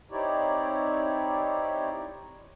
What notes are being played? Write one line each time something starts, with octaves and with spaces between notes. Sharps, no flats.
C4 D#4 E4 G4 C#5 D5